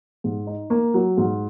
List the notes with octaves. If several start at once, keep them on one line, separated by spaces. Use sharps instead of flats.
G#2
D#4
A#3
F#3
G#2